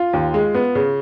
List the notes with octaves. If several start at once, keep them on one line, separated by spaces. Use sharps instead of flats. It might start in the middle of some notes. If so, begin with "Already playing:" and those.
Already playing: F4
D#2
G#3
B3
C#3